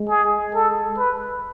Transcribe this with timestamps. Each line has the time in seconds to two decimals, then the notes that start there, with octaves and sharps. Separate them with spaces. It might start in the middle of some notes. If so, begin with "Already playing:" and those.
Already playing: G#3
0.09 G#4
0.54 A4
0.98 B4